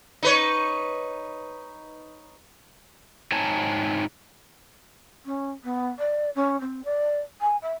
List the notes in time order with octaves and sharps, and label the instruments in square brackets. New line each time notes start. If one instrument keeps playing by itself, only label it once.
[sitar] D#4 B4 C#5
[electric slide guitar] G#2 C4 D#4 C#5 G#5 A5
[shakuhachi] C#4
B3
D5
C#4
C4
D5
G#5
E5